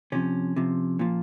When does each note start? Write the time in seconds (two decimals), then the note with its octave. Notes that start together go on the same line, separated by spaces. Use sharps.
0.12 C3 F3 C#4
0.56 C3 F3
0.99 A#2 F3